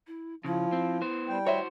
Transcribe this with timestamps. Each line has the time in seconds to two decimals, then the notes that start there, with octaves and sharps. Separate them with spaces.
0.07 E4
0.45 C#3 F3 E4
0.73 C4
1.02 B3 C5
1.28 G3 G5
1.46 F#4 C5 C#5 E5